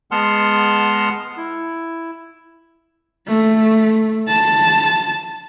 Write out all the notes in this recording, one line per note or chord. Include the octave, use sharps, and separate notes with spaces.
G#3 B3 F#5 A5 C6 F6
E4
A3
A5